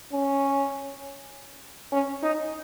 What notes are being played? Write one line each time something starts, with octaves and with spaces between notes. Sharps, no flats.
C#4
C#4
D#4